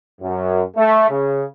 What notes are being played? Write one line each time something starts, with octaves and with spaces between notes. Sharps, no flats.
F#2
A3
C#3